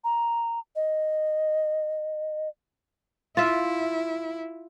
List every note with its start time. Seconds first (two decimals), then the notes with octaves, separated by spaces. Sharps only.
0.04 A#5
0.76 D#5
3.37 E4 F4 E5